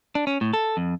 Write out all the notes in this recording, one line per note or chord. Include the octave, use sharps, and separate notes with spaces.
D4
C#4
A2
A4
F2